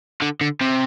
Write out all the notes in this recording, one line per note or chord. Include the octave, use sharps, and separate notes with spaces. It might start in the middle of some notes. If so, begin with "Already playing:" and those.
D3
D3
C3